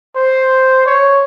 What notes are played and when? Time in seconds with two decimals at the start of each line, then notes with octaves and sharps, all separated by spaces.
0.16 C5
0.86 C#5